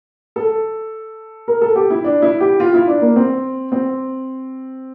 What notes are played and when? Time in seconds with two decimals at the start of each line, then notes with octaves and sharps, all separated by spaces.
0.36 A4
1.48 A#4
1.61 A4
1.76 G4
1.90 E4
2.04 D4
2.22 E4
2.41 G4
2.60 F4
2.74 E4
2.88 D4
3.01 A#3
3.16 C4
3.72 C4